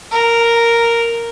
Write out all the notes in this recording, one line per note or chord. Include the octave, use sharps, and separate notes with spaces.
A#4